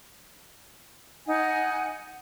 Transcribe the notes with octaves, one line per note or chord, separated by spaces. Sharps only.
D#4 F#5 G#5